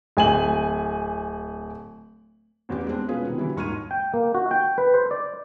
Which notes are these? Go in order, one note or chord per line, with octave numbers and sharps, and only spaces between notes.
D1 G#5 F#7
A1 E2 C#4 G4
G#3 B3 C4 D4
B2 G#3 C#4 F4 G#4 B4
C3 D#3 B3
D3 E3 F#3 G3 E4
D#1 G#2 C#6 F6 G#6 D#7
G5
A#3
F#4
G5
B4
C5
D5